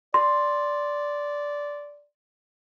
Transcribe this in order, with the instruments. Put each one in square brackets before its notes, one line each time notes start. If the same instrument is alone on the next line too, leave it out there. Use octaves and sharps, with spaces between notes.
[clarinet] D5 [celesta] C6